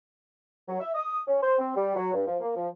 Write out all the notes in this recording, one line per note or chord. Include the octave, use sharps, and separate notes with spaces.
F#3
E5
D#6
C#4
C5
C4
G3
F#3
G2
F3
A#3
F3